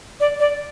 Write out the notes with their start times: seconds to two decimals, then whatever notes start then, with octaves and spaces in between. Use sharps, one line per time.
0.20 D5
0.40 D5